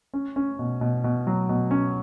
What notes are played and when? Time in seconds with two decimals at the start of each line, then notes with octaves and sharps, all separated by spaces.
0.14 C#4
0.36 C#4
0.59 B2
0.81 B2
1.04 B2
1.27 F#3
1.49 B2
1.71 C#4